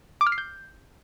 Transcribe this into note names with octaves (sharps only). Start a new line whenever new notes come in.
D6
F6
C7
G6